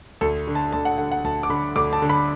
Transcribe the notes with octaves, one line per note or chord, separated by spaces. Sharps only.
D2 A4
D3
A5
D2 A5
F#5
D3 F#5
F#5
D2 A5
D6
D3 B5
D2 D6
A5
D3
B5